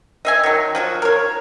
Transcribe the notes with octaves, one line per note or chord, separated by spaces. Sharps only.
D#5 E5 G#5
D#3 F#3
F3 F#3 F#4
A#4 C#5